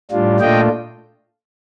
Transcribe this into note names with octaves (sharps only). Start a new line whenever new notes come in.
A2 G3 D4 F4
A#2 A3 D4 F4 D#5 G5